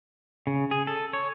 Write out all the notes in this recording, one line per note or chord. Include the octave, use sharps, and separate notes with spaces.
C#3
G#4
A4
C#5